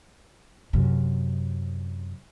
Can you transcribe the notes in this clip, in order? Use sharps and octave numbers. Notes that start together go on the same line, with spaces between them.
F#2 C3